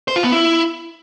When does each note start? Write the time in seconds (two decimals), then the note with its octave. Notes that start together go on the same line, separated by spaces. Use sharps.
0.08 C5
0.16 F4
0.24 B3
0.32 E4